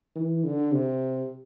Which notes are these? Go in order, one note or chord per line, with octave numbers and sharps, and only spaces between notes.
E3
D3
C3